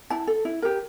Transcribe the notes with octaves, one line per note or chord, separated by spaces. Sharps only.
E4 A5
A4
E4
G4 A#4